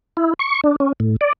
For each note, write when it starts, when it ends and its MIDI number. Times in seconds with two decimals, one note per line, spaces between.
0.17 0.34 64
0.39 0.61 85
0.64 0.76 62
0.80 0.93 61
1.00 1.16 45
1.21 1.33 74